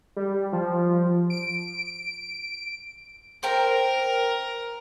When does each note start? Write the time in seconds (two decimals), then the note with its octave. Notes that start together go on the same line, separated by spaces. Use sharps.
0.16 G3
0.53 F3
1.30 D7
3.43 A#4 C5 G5 A#5